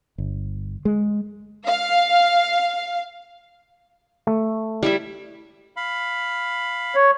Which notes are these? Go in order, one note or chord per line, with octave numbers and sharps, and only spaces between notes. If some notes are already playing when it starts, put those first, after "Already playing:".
G1
G#3
F5
A3
G3 E4 E5
F5 B5
C#5